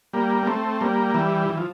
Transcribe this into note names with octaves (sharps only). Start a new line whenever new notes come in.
G3 A#3
A#3
A3 C4
G3 A#3
E3 G3
E3
F3